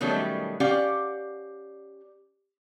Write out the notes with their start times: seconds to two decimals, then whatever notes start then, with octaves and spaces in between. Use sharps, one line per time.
0.01 B2 D#3 F#3 G3 A3 C#4
0.60 C#4 G4 D5 F5 F#5